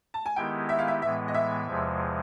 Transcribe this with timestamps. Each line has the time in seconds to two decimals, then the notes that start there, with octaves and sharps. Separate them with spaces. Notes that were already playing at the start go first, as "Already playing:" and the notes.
0.14 A5
0.26 G#5
0.36 D#3 G#3 B3 E4 G4 G5
0.69 E5
0.79 F5
0.88 E5
1.02 A2 E3 G#3 B3 E5
1.28 D#5
1.34 E5
1.67 E2 C3 F3 G#3